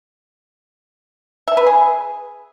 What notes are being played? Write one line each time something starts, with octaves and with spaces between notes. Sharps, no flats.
E5
B4
G#4